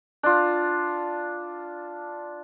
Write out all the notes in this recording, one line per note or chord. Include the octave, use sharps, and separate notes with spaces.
D4 F4